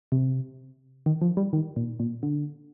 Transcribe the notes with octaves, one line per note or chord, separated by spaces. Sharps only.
C3
D#3
F3
G3
D#3
A#2
A#2
D3